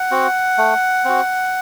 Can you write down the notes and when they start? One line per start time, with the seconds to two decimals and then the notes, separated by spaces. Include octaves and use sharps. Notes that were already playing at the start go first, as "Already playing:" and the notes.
Already playing: F#5
0.11 C4 F#4
0.58 A3
1.05 C4 F#4